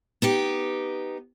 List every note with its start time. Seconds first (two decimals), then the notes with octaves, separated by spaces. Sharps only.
0.22 B3 D#4 G4